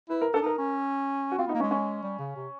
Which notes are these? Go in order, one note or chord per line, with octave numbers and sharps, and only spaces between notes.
E4 B4
A#4
D4 A4
D#4 A#4
C#4
F#4
C4 F4
B3 D#4
A#3
C#4
G#3
C#4
G3
C#3
C3